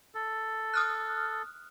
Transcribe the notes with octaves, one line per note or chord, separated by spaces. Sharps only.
A4
D#6 F6 F#6